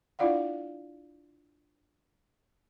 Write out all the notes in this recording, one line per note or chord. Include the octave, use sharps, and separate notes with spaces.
D4 E4 F4 D5 F5 F#5